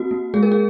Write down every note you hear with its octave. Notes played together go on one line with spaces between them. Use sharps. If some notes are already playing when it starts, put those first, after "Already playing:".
Already playing: A#3 C4 F#4
A#3
G#3 G#4
A#4
G#4